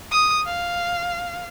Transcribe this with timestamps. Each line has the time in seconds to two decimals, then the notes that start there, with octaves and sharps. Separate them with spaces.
0.12 D#6
0.46 F5